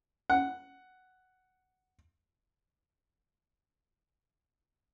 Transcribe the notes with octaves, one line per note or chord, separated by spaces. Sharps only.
F#5